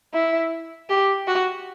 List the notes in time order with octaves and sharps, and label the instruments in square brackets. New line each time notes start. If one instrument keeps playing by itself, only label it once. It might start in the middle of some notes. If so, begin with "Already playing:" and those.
[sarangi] E4
G4
F#4